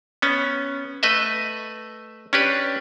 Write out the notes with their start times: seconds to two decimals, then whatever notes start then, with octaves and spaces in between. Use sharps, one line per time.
0.22 B3 C#4
1.03 A3 B4 D#5 E5
2.33 C#4 D4 G4 B4